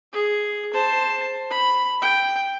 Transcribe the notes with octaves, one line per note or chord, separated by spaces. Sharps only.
G#4
C5 A5
B5
G5